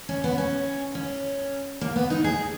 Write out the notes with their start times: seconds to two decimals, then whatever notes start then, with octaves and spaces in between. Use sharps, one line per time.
0.09 C#4
0.24 B3
0.38 C#4
0.95 C#4
1.81 A#3
1.96 B3
2.10 D#4
2.24 G#4